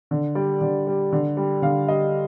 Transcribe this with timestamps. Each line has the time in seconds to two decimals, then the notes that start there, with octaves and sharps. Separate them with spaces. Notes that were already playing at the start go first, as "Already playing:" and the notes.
0.11 D3
0.35 G3 D5
0.61 D3
0.87 G3
1.13 D3
1.37 G3
1.62 D3 F5
1.88 G3 D#5